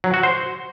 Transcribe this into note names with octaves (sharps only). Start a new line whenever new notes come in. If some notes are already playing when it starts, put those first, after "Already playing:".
F#3
F#4
C5